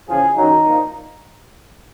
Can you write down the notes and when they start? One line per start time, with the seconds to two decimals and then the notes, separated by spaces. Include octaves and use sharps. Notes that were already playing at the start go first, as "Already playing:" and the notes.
0.09 E2 C#3 F3 G#4
0.37 F#2 D#3 F#3 D#4
0.66 A#2 F3